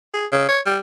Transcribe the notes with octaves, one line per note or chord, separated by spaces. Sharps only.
G#4
C#3
C#5
G3